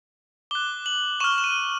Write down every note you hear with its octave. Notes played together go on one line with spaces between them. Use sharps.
D6 F#6 G7
F#7
C#6 F6 E7
E7
D#7